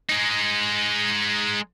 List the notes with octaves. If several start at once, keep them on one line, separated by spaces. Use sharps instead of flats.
G#3 D#4